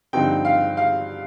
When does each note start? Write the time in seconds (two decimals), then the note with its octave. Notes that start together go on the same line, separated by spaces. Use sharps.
0.13 G2 D3 F3 C4 D#4 G5
0.45 F5
0.77 F5